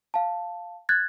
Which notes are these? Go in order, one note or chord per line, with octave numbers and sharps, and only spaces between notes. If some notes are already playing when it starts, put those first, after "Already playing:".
F5 A5
F#6 G#6 A6